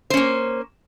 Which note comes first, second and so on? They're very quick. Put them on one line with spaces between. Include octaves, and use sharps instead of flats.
C5 C#4 A#3